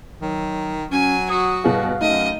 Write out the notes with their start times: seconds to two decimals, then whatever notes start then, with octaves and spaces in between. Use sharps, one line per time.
0.21 D#3 F#3
0.92 F#3 C#4 G#5
1.30 F#4 D#6
1.64 G1 B2 G#4 F5
2.01 F#2 A3 D#4 D#5